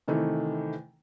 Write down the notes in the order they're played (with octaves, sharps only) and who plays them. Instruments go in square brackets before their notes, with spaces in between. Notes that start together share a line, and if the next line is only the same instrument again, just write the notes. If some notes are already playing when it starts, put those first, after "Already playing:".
[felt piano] C3 D#3 E3 A3